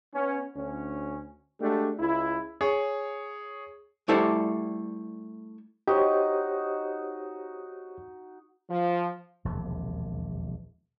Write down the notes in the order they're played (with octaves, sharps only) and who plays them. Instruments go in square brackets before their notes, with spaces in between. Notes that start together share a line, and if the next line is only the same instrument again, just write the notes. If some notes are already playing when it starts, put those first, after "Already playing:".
[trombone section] B3 C#4
D2 C#4
G#3 A3 D4 F#4 G4
C#2 E4
[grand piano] G#4 C#5
[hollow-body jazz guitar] G3 A3 E4 A4 C5 D5
[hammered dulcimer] D#4 F#4 [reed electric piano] G4 C5 C#5
[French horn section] F3
[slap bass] E1 A#1 D#2 C3